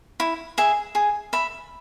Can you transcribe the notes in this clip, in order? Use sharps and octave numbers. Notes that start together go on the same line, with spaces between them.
E4
G#4 E5
G#4
E5 B5